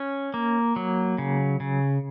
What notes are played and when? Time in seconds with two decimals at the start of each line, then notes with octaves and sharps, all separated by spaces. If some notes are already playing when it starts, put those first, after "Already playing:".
Already playing: C#4
0.34 A#3
0.76 F#3
1.18 C#3
1.60 C#3